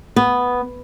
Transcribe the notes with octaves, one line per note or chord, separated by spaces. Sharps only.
B3